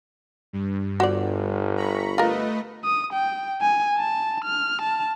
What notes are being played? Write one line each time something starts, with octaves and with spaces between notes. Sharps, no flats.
G2
G1 F#4 C5 D5
A#5 B5 C#6
A3 F4 A#4 B4 D#5
D#6
G5
G#5
A5
F6
A5